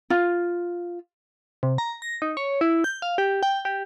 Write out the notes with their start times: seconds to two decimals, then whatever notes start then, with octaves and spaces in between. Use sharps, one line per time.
0.10 F4
1.63 C3
1.78 A#5
2.02 A#6
2.22 D#4
2.37 C#5
2.61 E4
2.84 G6
3.02 F5
3.18 G4
3.43 G5
3.65 G4